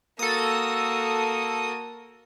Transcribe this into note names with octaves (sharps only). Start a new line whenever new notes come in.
A#3 F#4 A4 D#6